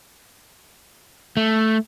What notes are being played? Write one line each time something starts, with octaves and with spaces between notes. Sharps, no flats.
A3